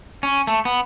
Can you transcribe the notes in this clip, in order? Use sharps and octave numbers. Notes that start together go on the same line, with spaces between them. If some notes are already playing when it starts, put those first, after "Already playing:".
C#4
A3
B3